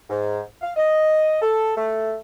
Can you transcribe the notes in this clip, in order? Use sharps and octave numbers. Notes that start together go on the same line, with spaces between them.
G#2
F5
D#5
A4
A3